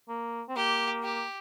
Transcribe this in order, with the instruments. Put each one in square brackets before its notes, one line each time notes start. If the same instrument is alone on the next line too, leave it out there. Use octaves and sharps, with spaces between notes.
[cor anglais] A#3
C4
[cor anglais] A#3 [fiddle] G4
[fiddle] G4